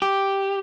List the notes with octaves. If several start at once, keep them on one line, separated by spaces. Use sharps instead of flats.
G4